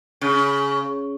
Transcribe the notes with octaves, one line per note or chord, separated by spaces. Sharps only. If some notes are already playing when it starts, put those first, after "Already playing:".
C#3